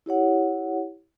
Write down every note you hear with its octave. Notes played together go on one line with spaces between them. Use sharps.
E4 G4 C#5 F#5